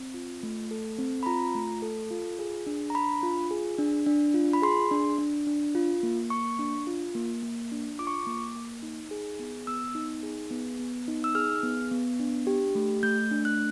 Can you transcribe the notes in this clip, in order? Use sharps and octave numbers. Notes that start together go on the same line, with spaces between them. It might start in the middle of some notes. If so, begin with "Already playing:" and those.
Already playing: C4
F4
A3
A4
C4
B5
F4 A#5
A3
A4
F4
G#4
D4
A#5
D4 B5
F4
G#4
D4
D4
F4
B5
G#4 C6
D4
D4
D4
F4
A#3
A#3 C#6
D4
F4
A#3
A#3
D4
F4 D6
C#6
D6
A#3
A#3
D#4
G#4
B3
B3 E6
D#4
G#4
B3
B3
D#4
E6
G#4 F6
B3
B3
D4
G4
A3
A3 G6
D4
F#6